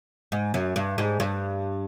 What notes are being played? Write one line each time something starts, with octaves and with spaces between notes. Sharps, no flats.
G#2
F#2
G2
G#2
G2